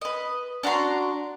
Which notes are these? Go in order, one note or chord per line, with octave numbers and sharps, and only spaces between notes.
B4 D#5
D4 F#4 A#5 C6